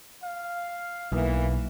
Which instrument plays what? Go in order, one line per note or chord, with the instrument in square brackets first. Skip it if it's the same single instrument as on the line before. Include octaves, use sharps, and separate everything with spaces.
[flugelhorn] F5
[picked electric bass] B1 [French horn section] E3 A#3